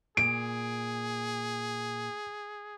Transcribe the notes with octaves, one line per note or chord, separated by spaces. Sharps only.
A#2 G#4 D7